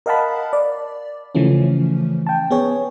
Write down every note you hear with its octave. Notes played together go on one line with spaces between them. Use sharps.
A#4 D#5 F5 F#5 A5 B5
D5
C#3 E3 F3 A3 C#4
G5 A5
B3 G#4 C#5